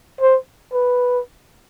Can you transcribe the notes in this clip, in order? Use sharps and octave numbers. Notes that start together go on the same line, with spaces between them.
C5
B4